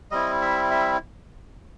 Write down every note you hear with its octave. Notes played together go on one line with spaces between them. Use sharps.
G3 C4 E4 D#5
E5
E5